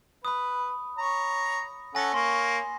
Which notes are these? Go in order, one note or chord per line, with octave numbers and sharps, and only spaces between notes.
B4 B5 D#6
C#5 A#5
C#4 A4 F#5 G#5 A#6
A#3 C#5 C6